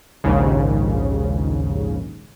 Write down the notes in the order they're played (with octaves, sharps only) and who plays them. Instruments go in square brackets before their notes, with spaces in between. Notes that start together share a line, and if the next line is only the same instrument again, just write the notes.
[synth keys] A#1 D#2 G#2 C#3